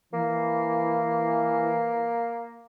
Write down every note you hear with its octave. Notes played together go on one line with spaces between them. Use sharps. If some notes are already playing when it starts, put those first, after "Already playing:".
E3 A#3